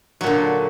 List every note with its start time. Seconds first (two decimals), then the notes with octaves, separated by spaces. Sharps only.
0.21 F#3
0.24 A#2
0.26 D3